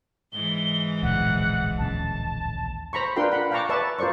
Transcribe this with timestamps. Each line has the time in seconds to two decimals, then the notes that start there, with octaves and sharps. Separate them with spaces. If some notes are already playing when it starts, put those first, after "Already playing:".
0.33 G#2 E3 G7
1.02 D1 A#1 F#5
1.78 A#1 D#2 C#4 A5
2.93 C5 A#5 B5 C#6
3.16 D4 F4 A#4 B4 G5 C6
3.32 F#5 B5
3.51 F5 G5 A5 A#5 C#6 D6
3.69 B4 D5 E5 G#5 A5 C#6
3.99 F4 A#4 C5 D5 C#6